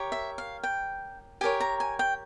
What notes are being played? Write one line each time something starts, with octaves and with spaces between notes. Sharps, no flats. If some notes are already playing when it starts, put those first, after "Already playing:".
Already playing: G4 A#4 C#5
E5
F5
G5
G4 A#4 C#5 G#5
A#5
G#5
G5